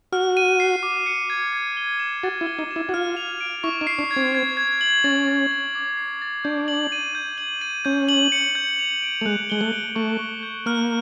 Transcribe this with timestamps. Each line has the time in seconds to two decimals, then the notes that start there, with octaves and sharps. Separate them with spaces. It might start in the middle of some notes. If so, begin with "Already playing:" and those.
0.13 F#4 F6
0.37 D#7
0.60 C7
0.83 D6
1.06 C#7
1.30 G#6
1.53 G#6
1.77 G7
1.99 E7
2.23 F#4 A6
2.41 E4
2.46 G7
2.59 D#4
2.71 E7
2.76 E4
2.89 F#4
2.94 F4 F6
3.17 F7
3.41 D7
3.64 E4 C#6
3.81 D#4
3.87 C7
3.99 D4
4.11 G#6
4.16 C4
4.35 G#6
4.57 G#6
4.81 F#7
5.04 C#4 A6
5.28 A6
5.51 F#7
5.75 D6
5.97 C7
6.22 A6
6.44 D4 G6
6.68 F#7
6.92 D#7
7.15 G6
7.38 F#7
7.61 D#7
7.85 C#4 G6
8.09 F#7
8.32 C#7
8.55 G6
8.79 F7
9.03 D7
9.21 A3
9.26 G#3 F#6
9.50 G#3 G7
9.61 A3
9.72 D7
9.95 A3 C#6
10.19 C#6
10.43 G6
10.66 A#3 F6